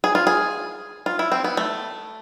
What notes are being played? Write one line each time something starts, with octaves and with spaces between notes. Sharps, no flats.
G#4
F4
G#4
F4
E4
C4
B3
A3